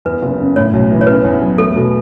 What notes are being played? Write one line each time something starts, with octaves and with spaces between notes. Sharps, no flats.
E2 B4
F#1
C#3
A2 C#5
B1
E3
C#5
C#3 B4
E2
F#3
A3 A4
B2